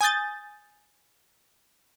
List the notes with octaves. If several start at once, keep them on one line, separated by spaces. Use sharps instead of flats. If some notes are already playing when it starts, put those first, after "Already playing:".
G#5 D#6 G6 A6